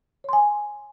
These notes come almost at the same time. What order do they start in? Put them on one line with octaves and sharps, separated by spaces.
C#5 C6 G#5